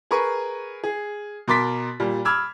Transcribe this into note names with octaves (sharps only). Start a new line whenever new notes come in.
G#4 A#4 B4 C#6
G#4
B2 A#4 C6 D6 A6 B6
A#2 G3
B5 D6 E6 F6 G#6